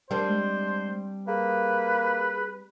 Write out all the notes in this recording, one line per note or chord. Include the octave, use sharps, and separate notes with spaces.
G3 C4 D4 A#4 C5
G#3
A#3 G#4 B4